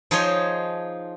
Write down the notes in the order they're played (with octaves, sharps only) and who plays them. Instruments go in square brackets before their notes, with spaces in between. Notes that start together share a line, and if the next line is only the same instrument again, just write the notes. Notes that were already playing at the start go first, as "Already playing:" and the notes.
[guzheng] F3 D#4 G#4 C5 C#5